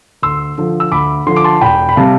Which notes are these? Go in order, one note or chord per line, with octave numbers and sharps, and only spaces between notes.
D2 C6 E6
D3 F3
E6
D2 B5 D6
D3 F3 C6
D6
A5 C6
E1 G5 B5
B5
C3 G3 F5 A5